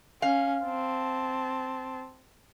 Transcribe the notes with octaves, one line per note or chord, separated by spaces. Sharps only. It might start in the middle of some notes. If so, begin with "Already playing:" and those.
C#4 F5
C4 A5